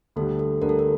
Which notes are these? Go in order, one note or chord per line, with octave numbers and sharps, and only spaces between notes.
D2 D3 G3 A4
A4
D2 D3 G3 A#4
A4
A#4